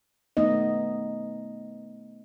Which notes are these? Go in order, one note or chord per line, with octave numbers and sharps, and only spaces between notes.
A3 B3 D#4 D#5